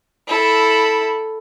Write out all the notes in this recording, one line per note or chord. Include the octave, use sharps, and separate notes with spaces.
E4 A4